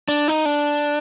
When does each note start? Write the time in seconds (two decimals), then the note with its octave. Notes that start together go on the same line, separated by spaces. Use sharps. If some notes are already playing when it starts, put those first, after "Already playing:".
0.08 D4
0.28 D#4
0.45 D4